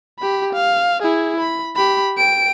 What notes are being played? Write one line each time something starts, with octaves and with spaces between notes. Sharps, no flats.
G4 B5
F5
E4 G#4
B5
G4 B5
G5 D7